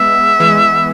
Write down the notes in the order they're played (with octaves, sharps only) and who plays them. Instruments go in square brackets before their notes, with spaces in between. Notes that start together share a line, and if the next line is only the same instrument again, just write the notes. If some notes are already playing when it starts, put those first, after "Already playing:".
Already playing: [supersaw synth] G#3 B3 [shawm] E5
[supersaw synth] E3 G#3